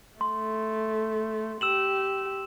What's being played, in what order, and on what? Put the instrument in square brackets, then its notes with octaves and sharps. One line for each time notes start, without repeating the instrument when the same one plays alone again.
[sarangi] A3 [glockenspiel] C6
[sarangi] G4 [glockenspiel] E6 E7 F#7